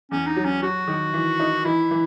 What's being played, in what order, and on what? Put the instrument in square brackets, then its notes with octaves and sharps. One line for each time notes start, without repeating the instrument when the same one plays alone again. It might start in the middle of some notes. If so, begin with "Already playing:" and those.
[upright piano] E2 [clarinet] C#4
[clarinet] D#4
[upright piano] F#3
[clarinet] C#4
[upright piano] F#3 [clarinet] F#4
[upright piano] D#3
E3
D#4
[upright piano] E3 [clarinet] E4
[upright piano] E3